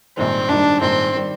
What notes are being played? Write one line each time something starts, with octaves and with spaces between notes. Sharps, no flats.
A#1 G#2 D#3 G3 C4
A#1 G#2 D#3 G3 D4
A#1 G#2 D#3 G3 C4
D#3 G3